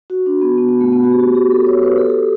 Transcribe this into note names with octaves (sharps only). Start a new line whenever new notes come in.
F#4
D4
B3
B3
B3
A3
B3
F#4
G4
F#4
G4
A4
C#5
B4
A4
G4